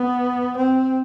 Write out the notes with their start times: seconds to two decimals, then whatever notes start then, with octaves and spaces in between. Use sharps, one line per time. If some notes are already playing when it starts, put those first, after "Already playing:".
Already playing: B3
0.56 C4